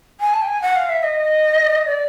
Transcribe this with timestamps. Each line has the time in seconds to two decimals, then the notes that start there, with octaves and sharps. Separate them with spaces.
0.20 G#5
0.33 A5
0.41 G5
0.48 G#5
0.62 F#5
0.76 F5
0.89 E5
1.03 D#5
1.86 D5